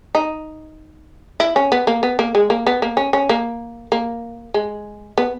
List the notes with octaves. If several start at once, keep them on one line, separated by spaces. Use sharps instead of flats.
D#4
E4
C#4
B3
A#3
B3
A#3
G#3
A#3
B3
A#3
C#4
C#4
A#3
A#3
G#3
B3